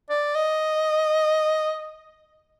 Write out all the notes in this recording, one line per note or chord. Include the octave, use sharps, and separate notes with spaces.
D5
D#5